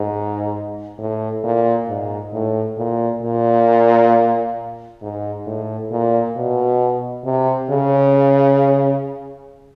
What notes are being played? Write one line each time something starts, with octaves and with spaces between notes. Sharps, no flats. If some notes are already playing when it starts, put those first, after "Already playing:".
Already playing: G#2
A2
A#2
G#2
A2
A#2
A#2
G#2
A2
A#2
B2
C3
C#3